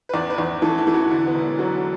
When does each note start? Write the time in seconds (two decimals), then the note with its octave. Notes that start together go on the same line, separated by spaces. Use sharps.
0.09 B4
0.14 E2 D5
0.30 B4
0.38 E2
0.46 B4
0.62 E3 A4
0.78 E4
0.87 E3
0.94 F#4
1.10 D3 E4
1.27 B3
1.34 E1
1.59 F#3 F#4